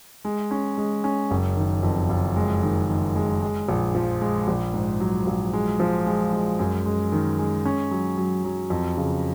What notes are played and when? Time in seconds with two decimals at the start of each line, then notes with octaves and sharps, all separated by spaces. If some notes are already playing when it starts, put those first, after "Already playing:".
0.25 G#3
0.51 C#4
0.78 G#3
1.04 C#4
1.31 F#1
1.57 D#3
1.83 F2
2.09 F#1
2.36 G#3
2.63 D#3
2.89 D#3
3.16 G#3
3.42 G#3
3.69 A#1
3.95 F3
4.21 G#3
4.48 A#1
4.74 G#2
5.00 F#3
5.27 A#1
5.53 G#3
5.80 F3
6.06 G#3
6.33 G#3
6.59 F#2
6.86 G#3
7.12 D#3
7.38 G#3
7.65 C#4
7.91 F#3
8.18 F#3
8.45 F#3
8.70 F2
8.97 C#3